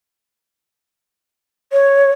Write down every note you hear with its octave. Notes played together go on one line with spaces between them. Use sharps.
C#5